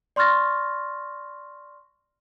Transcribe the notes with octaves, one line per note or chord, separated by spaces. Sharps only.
D5 C6 C#6 F6 A6 A#6